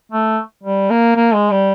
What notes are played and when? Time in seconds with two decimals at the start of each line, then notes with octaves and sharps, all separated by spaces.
0.12 A3
0.63 G3
0.90 A#3
1.16 A#3
1.34 G#3
1.51 G3